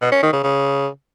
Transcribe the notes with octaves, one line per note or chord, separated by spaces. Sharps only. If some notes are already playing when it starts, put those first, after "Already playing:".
B2
C#4
D#3
C#3
C#3